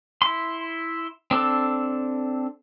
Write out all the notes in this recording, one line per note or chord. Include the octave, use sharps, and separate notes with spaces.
E4 C6
C4 D4 A4